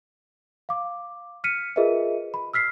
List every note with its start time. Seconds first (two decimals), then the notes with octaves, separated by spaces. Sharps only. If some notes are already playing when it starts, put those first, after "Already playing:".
0.69 F5 D6
1.44 F6 B6 C#7 D#7
1.76 F4 G#4 A#4 B4 D#5 E5
2.34 B5
2.54 E6 F6 B6 C7